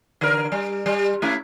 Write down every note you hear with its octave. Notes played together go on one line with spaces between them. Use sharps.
D3 A#4
G3
G3
A3 C#4 E4